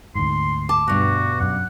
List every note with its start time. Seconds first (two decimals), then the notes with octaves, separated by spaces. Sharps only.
0.15 D2 G#2 C6
0.69 A5 D6
0.88 G2 B2 F#4
1.40 F#2 F#5